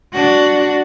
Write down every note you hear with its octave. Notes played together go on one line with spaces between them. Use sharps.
D4 F#4